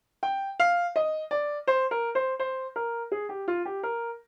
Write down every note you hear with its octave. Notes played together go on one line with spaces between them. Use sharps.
G5
F5
D#5
D5
C5
A#4
C5
C5
A#4
G#4
G4
F4
G4
A#4